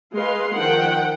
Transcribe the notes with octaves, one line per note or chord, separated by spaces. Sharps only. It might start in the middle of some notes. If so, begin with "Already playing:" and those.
G#3 B4 F5 C6
D#3 F3 F#5 G5